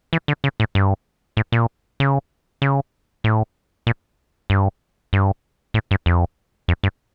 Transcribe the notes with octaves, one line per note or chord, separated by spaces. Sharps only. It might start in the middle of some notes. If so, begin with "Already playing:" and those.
E3
D3
C#3
A2
G2
A2
A#2
C#3
C#3
A2
A#2
G2
G2
A2
G2
F2
F2
G2